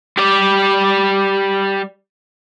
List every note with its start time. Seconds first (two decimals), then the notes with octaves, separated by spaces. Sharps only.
0.17 G3 D5